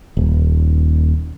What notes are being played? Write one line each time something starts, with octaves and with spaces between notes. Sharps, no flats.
D#1